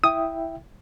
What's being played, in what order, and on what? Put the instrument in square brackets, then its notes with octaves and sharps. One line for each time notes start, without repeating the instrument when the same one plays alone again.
[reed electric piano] E4 E5 G5 [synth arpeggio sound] D#6